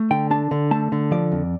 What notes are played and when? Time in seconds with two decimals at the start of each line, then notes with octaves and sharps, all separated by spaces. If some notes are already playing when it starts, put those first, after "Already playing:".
Already playing: A3
0.11 D3 G5
0.31 D4 A5
0.51 D3
0.71 A3 A5
0.92 D3
1.11 F3 D5
1.32 F2